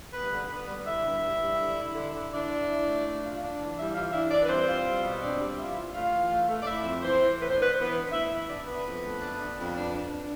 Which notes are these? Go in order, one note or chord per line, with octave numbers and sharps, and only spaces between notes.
G2 B3 B4
D3
D3 B3 B4
G3
D3 E4 E5
G2
G2
G2
D3
E4
D3
D3
D4 E4 D5
E4
E4
A3
D4
F4
D4
E3
G3 E4 E5
E3 F4 F5
D4 E4 E5
E3 D4 D5
B4
G3 C4 C5
F4
G3
B2
C4 D4 D5
G3
E4 F4 E5
F4
A3 F4 F5
E3
A3
A3
D5
A3 E4 E5
F2
E3 C4 C5
E3
A2 B4
C5
D4 B4
E3 C5
B3 B4
D4
A2 E4 E5
E3 E4 E5
B3 D4 D5
B3 D4 B4
F2
A3
D4
D4
F2
D4
D4
D4